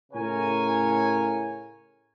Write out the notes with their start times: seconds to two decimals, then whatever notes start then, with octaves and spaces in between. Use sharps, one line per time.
0.12 A2 C#3 A#4 C#5 G#5